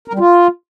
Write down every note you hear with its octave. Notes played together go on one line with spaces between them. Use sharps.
A#4
G3
F4